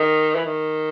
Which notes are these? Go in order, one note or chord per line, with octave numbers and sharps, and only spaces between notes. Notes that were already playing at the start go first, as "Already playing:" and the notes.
Already playing: D#3
E3
D#3